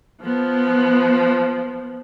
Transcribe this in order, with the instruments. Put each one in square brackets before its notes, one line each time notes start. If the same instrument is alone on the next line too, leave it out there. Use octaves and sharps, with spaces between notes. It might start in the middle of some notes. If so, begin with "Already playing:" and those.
[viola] F3 B3